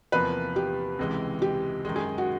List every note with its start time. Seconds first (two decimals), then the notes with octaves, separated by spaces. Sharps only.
0.12 E2 C3 F3 A#3 B4
0.56 G4
0.99 C#2 C3 E3 G#3
1.42 G4
1.85 F#2 D#3 G#3
1.96 G#4
2.18 F#4